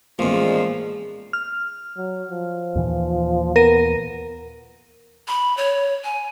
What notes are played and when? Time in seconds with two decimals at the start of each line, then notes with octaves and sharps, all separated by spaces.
0.19 A1 E2 A#2 F3 G#3
1.33 F6
1.97 F#3
2.31 F3
2.75 D#2 A#2 E3
3.56 B3 A#4 A#6 D#7
5.28 B5
5.57 C#5
6.04 G#5